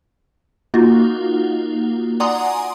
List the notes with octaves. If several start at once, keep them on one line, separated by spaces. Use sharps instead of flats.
A#3 D#4 F4 F#4
D5 F#5 G#5 A#5 C6 D#6